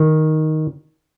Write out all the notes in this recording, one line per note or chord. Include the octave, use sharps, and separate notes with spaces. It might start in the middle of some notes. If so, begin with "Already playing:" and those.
Already playing: D#3